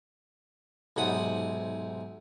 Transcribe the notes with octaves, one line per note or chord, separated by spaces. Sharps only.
B1 G#2 C3 F#5 B5 D#6